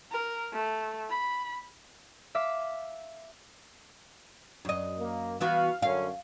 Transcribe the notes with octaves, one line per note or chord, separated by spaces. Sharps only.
A#4
A3
B5
E5 F5 D6 B6
F#2 D#5
A#3
E3 B3 F#4 F5
F#2 D3 C#4 F5